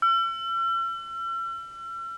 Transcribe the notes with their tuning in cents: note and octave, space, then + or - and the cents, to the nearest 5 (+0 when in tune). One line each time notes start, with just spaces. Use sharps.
E6 +45